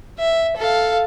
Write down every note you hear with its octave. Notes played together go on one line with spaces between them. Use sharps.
E5
A4 F5